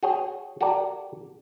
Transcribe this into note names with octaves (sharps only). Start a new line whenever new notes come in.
F#4 G#4 C#5 G5
F#4 G4 A4 A#4 D5